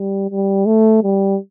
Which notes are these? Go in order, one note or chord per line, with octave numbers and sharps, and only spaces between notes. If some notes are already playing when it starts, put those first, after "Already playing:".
Already playing: G3
G3
A3
G3